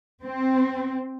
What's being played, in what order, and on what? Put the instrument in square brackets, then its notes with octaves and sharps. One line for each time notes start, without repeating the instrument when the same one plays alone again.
[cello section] C4